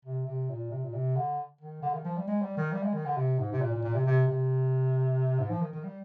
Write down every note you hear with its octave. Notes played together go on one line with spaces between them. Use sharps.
C3
C3
A#2
C3
A#2
C3
D3
D#3
D3
D#3
F3
G3
G#3
G3
D#3
G3
G#3
D#3
D3
C3
G#2
C3
A#2
A#2
A#2
C3
C3
C3
G#2
F3
D#3
D#3
G3